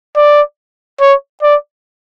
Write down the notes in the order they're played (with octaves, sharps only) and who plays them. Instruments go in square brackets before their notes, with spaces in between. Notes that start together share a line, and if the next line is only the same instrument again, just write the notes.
[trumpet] D5
C#5
D5